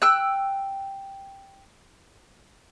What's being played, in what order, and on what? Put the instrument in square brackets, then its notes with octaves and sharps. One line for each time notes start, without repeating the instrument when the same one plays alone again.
[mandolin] G5 E6 F#6